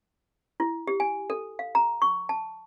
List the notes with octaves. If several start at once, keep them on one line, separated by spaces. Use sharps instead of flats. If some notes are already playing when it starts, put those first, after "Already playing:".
E4
G4
G#5
A4
F5
A#5
C#6
A5